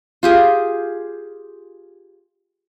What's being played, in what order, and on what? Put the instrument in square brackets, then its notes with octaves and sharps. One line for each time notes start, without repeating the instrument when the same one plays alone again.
[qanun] F4 G4 G#4